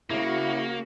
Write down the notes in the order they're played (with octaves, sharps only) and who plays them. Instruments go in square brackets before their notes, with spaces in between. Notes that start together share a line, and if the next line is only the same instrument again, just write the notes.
[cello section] C#3 F#4 [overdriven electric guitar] A#3 [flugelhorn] E4